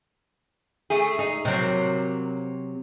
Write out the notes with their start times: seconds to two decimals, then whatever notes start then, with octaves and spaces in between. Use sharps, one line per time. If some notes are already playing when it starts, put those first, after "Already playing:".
0.90 A3 G#4
1.19 D#4 G#4
1.45 C3 F#3 A#3 C4